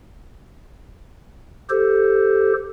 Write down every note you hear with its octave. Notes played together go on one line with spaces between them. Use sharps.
G4 A4 C5